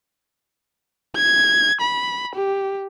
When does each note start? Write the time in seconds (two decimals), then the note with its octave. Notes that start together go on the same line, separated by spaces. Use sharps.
1.17 G#6
1.81 B5
2.36 G4